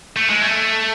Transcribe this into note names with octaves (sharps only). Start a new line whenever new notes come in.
A3
G#3
A3